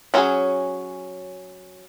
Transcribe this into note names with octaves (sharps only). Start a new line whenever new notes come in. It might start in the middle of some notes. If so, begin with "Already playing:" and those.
F#3 C#4 D#4 F#4 G#4